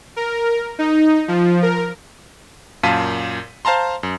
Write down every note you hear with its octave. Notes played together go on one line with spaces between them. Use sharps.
A#4
D#4
F3
A#4
F#2 A#2 F5 A5 B6 D#7
C5 F5 A5 A#5 C6
F#2